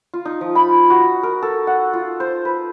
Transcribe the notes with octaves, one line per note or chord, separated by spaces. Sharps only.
F4
D#4
F3
B5
F4
F#4
A#4
A4
F#5
F4
C5
B4